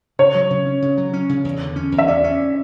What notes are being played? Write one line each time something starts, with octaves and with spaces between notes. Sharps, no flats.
C#3 C#5
F#3
C#3
C#4
C#3
F#3
C#4
C#3
E2
D3
C#4
E2
E5
C#4 D5
C#4